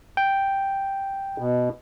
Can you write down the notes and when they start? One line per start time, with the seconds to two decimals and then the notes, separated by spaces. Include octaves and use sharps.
0.17 G5
1.38 B2